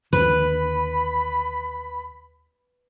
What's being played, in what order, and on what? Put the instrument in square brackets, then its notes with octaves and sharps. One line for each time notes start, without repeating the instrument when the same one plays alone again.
[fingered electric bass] D#2 D3 [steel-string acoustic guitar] B4 [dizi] B5